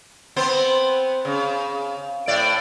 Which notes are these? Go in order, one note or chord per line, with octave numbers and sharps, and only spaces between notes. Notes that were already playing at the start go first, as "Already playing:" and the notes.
B3 C4 C5
C#3
A2 D5